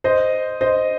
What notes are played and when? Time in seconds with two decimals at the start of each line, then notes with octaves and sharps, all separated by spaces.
0.04 C5 D#5
0.61 C5 D#5